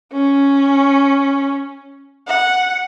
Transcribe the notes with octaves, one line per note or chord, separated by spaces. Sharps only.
C#4
F#5